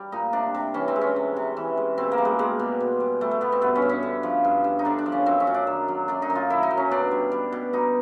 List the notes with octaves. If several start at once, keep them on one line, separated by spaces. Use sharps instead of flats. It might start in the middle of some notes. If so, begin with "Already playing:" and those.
Already playing: G3
A#2 D#4
C3 D4
C3
E3 C#4
C4
G#3
C#4
C3
C3
E3
G#3
B2 C4
A#3
G3
G#3
G3 G#3
B2
B2
G3
G3 A3
A3
B2 B3
C4
G2 B3
C#4
G2
C#4
D3
F3
G2
G2
D#4
D3 D4
D4
F3
C#4
F#2 C4
C#4
F#2
D4
D#3
F#3
F#2 D4
D#4
F#2
F4
D#3 E4
D#4
F#3
C#4
B2 D4
G3
G3
B2
B2 D#4